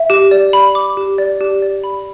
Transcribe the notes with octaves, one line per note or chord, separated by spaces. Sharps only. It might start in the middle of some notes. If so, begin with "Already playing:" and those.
Already playing: E5
G4
D5
B5
D6
G4
D5
G4
D5
B5